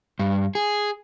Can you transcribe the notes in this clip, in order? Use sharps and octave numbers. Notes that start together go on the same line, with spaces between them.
G2
G#4